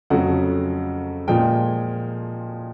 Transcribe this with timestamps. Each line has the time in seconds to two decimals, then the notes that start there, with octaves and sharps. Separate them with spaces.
0.10 F2 C#3 F#3 A3 F#5
1.28 A#2 F3 G#3 G5